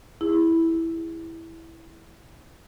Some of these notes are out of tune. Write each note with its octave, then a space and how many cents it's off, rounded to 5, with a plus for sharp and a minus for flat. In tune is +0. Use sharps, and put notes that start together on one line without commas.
E4 -5 G#4 -30